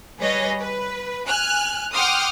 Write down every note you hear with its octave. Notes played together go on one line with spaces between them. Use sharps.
G3 G#4 B4 C#5 D#5
B4
G#5 F6 F#6
F#5 G5 C6 D6 D#6 F6